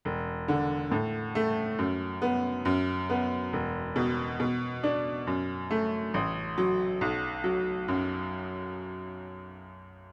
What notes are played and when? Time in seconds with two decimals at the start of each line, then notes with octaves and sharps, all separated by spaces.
0.05 E1
0.48 D3
0.91 A2
1.35 A3
1.79 F#2
2.22 B3
2.65 F#2
3.09 B3
3.53 E1
3.96 B2
4.40 B2
4.83 D4
5.27 F#2
5.71 A3
6.14 A1
6.58 F#3
7.01 B1
7.44 F#3
7.88 F#2